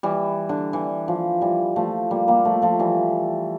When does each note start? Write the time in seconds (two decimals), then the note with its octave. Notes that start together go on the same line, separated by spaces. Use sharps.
0.03 E3 G3
0.49 D3
0.73 E3
1.08 F3
1.41 E3 G3
1.76 F3 A3
2.11 G3 A#3
2.28 G3 A#3
2.45 F3 A3
2.62 F3 A3
2.79 E3 G3